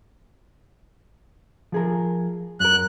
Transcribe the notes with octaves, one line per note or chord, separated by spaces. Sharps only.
F3 G#4 A#4
F#2 A#4 F#6